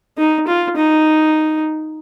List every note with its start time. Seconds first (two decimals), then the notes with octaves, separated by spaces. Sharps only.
0.18 D#4
0.47 F4
0.77 D#4